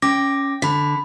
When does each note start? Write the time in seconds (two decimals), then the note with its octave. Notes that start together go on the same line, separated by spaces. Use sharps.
0.02 C#4 G5 D6 A#6
0.62 D3 B5 B6